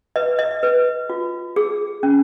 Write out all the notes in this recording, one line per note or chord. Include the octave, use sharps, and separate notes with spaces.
B4 D#5
D#5
B4
F4
G#4
C#4